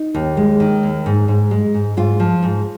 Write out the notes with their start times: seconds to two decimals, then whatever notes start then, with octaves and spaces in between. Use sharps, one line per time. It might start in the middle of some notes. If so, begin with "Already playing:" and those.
Already playing: D#4
0.14 D#2
0.37 G#3
0.60 D#3
0.83 D#2
1.06 G#2
1.28 G#2
1.51 G#3
1.74 G#2
1.97 G#2 F4
2.20 F3
2.43 G#2